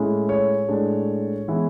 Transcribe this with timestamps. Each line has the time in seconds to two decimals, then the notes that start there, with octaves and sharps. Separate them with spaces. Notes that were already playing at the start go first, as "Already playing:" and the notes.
Already playing: A2 G#3 C#4 E4
0.29 C#5
0.68 A2 G#3 D4
1.48 E3 G#3 B3 E4